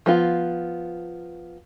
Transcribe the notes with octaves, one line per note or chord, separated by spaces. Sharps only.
F3 B3 F4